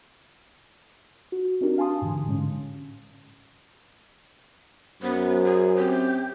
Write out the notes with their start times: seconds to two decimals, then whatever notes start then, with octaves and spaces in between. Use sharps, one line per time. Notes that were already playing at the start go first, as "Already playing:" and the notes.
1.32 F#4
1.61 C4 D4 D#4 F#4 G4 A#4
1.78 F5 G#5 A5 C6 D#6
2.02 G#2 D3 E3
2.26 A2 D3 G#3 C#4
5.02 F#2 B3 C5
5.44 G#4
5.78 C4 G4